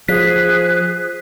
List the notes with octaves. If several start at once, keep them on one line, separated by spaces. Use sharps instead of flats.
F3 G#4 F#6 B6